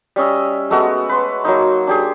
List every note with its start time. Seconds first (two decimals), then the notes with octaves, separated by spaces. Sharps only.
0.16 G3 C#4 D#5 E5
0.70 G#3 A3 B3 F#4
1.09 B4 C6
1.45 F#3 A#3 D#4
1.87 D4 G4 G#4